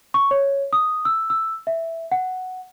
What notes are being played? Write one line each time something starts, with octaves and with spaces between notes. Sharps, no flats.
C#6
C#5
D#6
E6
E6
E5
F#5